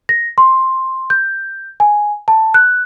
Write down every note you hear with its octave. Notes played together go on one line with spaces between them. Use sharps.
A#6
C6
G6
G#5
A5
F#6